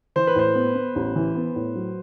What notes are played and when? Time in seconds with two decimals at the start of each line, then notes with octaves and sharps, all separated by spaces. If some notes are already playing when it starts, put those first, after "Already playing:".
0.16 E3 C5
0.27 B4
0.35 A2 C5
0.55 B3
0.75 B3
0.95 A1
1.15 E3
1.35 B3
1.56 A2
1.75 F#3